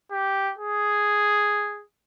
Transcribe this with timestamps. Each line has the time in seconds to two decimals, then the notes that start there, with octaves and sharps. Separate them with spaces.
0.11 G4
0.58 G#4